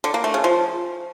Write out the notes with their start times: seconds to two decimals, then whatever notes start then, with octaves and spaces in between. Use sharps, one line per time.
0.04 D3
0.14 A#3
0.24 A3
0.34 C#3
0.44 F3